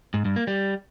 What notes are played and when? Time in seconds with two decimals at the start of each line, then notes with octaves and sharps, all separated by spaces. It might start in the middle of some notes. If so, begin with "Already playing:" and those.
0.14 G#2
0.25 G2
0.36 A#3
0.47 G3